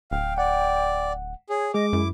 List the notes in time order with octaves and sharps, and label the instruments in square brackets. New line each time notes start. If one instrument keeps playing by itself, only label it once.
[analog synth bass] D1 [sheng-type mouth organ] F5 [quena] G5
[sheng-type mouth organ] D5 [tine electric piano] F#5
[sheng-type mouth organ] G#4 [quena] C#5
[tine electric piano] G#3 G#4 [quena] D#5 [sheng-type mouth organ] D6
[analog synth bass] F#2 [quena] E4